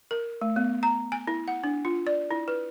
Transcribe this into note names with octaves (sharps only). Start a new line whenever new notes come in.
A#4
A3
B3
A#5
G#5
E4
F#5
D4
F4
D5
E4
B4